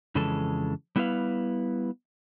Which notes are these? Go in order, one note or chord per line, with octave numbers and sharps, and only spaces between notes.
F2 C#3 E3 G#3 A4 A5
G3 B3 E4 G4 B4 F5